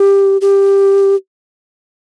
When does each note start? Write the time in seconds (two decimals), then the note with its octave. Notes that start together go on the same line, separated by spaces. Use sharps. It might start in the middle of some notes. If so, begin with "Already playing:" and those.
Already playing: G4
0.41 G4